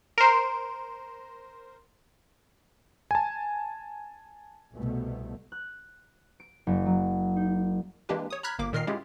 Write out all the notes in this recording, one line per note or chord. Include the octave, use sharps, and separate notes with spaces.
A#4 C5
G#5 A5
C2 B2 A3
F#6
D7
F#1
F#3
D#4
E3 G#3 A#3 D4 G4 B4
C#5 D#6
A#5 B5 F6 F#6 G#6 B6
G1 A#3 D6
A#2 D#3 A#4 D#5 F6 C7
G#3 C#4 E4 F4 G4 G#4